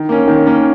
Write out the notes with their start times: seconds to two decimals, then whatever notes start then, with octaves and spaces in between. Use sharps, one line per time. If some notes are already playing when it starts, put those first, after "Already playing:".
Already playing: D#3
0.09 A#3 C#4
0.27 D#3
0.47 A#3 C#4